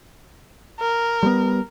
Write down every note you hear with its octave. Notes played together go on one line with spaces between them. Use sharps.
A#4
G3 G#3 B3